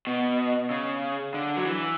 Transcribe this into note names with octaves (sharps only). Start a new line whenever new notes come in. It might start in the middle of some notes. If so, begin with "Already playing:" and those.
B2
C#3
D3
F#3
E3